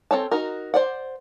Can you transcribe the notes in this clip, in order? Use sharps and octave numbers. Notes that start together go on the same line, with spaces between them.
C4 A4 C#5 A5
D#4 F#4 A#4
C5 D5 F#5